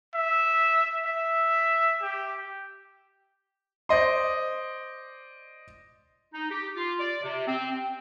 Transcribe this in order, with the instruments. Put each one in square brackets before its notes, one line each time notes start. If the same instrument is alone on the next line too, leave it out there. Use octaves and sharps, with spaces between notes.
[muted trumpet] E5
E5
G4
[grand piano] C5 D5 D#5 C6
[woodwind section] D#4
G4
F4
D5
C3
C4
C4